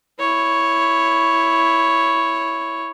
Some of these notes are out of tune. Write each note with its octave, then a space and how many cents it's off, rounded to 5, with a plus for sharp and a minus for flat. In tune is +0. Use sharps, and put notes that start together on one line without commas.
E4 +0 C#5 +0